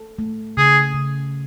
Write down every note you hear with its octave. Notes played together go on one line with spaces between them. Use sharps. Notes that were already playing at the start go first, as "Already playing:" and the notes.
Already playing: A4
A3
C#3 G#4
C#3